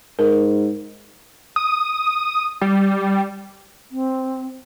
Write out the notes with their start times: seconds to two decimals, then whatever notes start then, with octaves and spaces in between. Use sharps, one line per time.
0.19 G#2 A#4
1.56 D#6
2.61 G3
3.92 C4